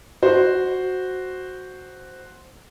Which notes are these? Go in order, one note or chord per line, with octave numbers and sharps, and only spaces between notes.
F#4 C5